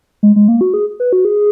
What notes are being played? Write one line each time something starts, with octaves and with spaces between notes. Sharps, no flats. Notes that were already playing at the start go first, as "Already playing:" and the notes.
G#3
G#3
A#3
F#4
G#4
B4
F#4
G#4